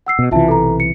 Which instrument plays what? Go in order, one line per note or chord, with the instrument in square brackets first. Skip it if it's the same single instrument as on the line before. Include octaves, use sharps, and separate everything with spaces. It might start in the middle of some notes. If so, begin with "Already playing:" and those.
[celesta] F#5 E6 C7
[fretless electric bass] B2
[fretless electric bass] B1 C3 E3 [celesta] F4 E5 A5
[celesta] A4 A#5
C#7